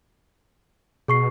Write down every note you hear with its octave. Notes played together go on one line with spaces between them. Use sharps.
B2 G#4 C#6 C7